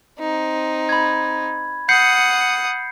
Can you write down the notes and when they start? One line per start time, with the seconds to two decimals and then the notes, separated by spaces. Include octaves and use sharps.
0.19 C4 D#4
0.89 B5 G#6
1.89 F#5 D#6 G6 C7 C#7